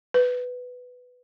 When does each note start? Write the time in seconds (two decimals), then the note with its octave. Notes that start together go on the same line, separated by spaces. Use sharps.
0.14 B4